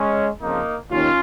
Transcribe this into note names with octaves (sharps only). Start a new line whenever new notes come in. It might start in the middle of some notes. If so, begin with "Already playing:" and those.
Already playing: G#3 C#4
F2 C#3 F3 A#3 D#4
D#2 D#3 C#4 F4